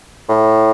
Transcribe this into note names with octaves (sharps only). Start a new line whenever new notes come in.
A2